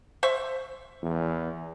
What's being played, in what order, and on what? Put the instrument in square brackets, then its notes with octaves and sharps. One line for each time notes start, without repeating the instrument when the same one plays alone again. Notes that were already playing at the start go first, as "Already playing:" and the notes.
[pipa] C5 E5 C#6
[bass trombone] E2